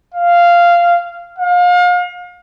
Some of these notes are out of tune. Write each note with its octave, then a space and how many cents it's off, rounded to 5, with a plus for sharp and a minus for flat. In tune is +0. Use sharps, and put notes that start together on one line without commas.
F5 -10
F5 +35